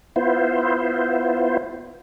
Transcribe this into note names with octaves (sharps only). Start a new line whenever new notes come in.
B3 E4 F4 C5